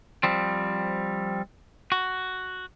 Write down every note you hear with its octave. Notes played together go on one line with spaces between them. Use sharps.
F3 G3 C4
F#4